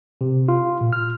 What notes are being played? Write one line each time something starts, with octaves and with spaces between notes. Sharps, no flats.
C3
F4
A#2
F6